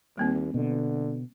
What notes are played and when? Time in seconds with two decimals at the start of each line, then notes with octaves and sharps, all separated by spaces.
0.17 D#2 G3 A#3 C4
0.54 B2 D3